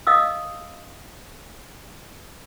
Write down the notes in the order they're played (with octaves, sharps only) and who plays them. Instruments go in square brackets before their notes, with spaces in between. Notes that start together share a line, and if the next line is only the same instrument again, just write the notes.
[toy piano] D#5 F5 D#6 E6